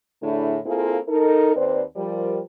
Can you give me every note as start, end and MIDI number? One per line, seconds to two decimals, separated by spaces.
0.23 0.59 45
0.23 0.59 50
0.23 0.59 57
0.23 0.59 62
0.23 0.59 64
0.23 0.59 68
0.66 0.99 58
0.66 0.99 60
0.66 0.99 64
0.66 0.99 65
0.66 0.99 68
0.66 0.99 69
1.09 1.55 63
1.09 1.55 69
1.09 1.55 70
1.56 1.82 39
1.56 1.82 60
1.56 1.82 71
1.56 1.82 72
1.56 1.82 74
1.96 2.41 53
1.96 2.41 55
1.96 2.41 70